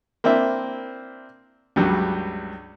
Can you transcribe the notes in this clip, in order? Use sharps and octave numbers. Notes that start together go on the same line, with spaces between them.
A#3 C4 D4 E4 E5
C#2 G2 F#3 G3